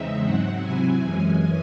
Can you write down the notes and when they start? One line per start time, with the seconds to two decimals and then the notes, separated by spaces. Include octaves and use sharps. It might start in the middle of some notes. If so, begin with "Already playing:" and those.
Already playing: E2 C#3 G#3 C4 D#4 E5
0.24 G#2 F#3 C4 F#5
0.61 C3 F#3 C4 E4 G#5
0.98 F#2 E3 G#3 C#4